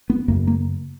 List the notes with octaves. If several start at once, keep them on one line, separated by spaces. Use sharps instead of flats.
B3
F#2 C#3 A#3
A#3